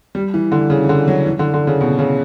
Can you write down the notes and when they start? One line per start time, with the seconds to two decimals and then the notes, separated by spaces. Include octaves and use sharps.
0.15 G3
0.34 E3
0.52 D3
0.70 C#3
0.83 E3
0.89 D3
1.08 F#3
1.26 E3
1.39 D3
1.54 D3
1.67 C#3
1.81 B2
1.99 C#3